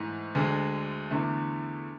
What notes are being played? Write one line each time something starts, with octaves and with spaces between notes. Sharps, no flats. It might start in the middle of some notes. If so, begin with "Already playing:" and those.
Already playing: G#2 E3 A3
D2 D3 G#3
E2 D3 A3